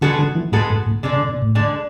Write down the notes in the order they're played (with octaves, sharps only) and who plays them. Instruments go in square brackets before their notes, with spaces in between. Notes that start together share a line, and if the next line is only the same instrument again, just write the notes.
[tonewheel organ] D3 [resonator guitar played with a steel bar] G#3 B3 F#4 A4
[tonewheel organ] D3
E3
[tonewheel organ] A2 [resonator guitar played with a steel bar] G#3 B3 F#4 A4
[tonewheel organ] G#2
A2
[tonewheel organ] B2 [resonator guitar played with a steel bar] D3 G#3 D4
[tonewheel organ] C#3
B2
A2
[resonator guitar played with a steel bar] D3 G#3 D4